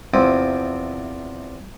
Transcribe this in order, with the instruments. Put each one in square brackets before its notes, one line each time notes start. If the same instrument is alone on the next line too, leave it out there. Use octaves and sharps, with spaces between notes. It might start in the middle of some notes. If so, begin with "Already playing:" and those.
[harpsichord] E2 C3 F3 C4